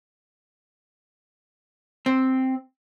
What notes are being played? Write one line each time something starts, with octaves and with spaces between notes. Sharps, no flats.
C4